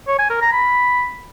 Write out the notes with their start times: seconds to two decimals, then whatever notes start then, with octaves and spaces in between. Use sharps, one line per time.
0.08 C#5
0.19 G#5
0.30 A#4
0.41 A#5
0.52 B5